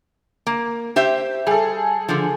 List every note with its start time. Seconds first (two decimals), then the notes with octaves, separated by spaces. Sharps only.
0.47 A#3
0.96 G4 C5 E5
1.47 G3 G#4 A4
2.08 D3 F3